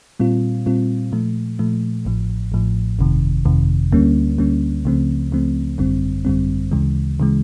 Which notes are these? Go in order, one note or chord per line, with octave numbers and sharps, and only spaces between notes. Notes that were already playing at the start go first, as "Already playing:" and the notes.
A#2 G3 C4 F4
A#2 G3 C4 F4
A#2 F3 A3
A#2 F3 A3
A1 A2 F3
A1 A2 F3
G1 F2 C3 D#3
G1 F2 C3 D#3
D2 D3 G3 A#3 C#4
D2 D3 G3 A#3 C#4
C#2 C#3 F3 A3 C4
C#2 C#3 F3 A3 C4
G#1 F#2 D3 G3 C4
G#1 F#2 D3 G3 C4
D2 C#3 E3 G#3
C#3 E3 G#3